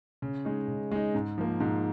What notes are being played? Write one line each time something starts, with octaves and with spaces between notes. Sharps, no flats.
C#3
G#3 D#4
C#3
G#3 D#4
G#2
F3 A#3
G#2